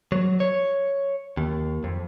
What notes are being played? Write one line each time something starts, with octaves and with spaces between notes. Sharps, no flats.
F#3
C#5
D#2
F2